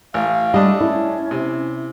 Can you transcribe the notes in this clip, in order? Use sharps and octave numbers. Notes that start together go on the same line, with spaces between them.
A1 F5
G3 A3 D4 D#5
C#4 E4
C3